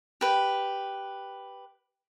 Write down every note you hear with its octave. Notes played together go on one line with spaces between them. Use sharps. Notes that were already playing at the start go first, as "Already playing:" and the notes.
G4 B4